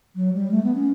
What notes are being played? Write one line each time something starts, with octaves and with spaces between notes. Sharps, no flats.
F#3
G3
A3
B3
C#4